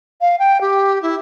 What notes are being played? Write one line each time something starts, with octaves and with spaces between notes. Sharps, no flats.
F5
G5
G4
E4